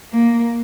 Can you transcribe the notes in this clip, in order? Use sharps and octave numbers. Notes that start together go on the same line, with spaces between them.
A#3